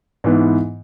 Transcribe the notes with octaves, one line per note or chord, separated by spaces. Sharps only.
G#2 E3 B3